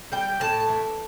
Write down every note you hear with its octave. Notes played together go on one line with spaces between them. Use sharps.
G3 G5
A2 A5
E3